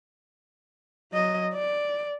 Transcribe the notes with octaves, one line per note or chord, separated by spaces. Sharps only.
F#3 D#5
D5